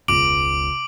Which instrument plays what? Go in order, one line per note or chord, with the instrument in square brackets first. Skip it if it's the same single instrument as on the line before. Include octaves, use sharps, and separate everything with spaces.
[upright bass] E1 C#2 [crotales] D6 D7 F#7